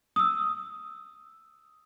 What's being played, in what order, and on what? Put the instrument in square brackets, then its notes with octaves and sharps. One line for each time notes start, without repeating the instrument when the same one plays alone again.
[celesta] D#6 E6